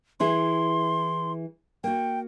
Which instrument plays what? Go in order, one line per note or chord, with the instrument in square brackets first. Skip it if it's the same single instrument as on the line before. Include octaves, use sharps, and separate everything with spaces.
[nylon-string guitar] E3 E4 G#4 [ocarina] C6
[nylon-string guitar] A#3 F#4 [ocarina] G5